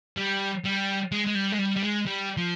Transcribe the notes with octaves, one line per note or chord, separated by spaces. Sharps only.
G3
G3
G#3
G#3
G3
G#3
G3
G3
G#3
G3
F3